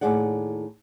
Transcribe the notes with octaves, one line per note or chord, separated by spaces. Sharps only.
D#2 A2 D#3 G#4 D5 F#5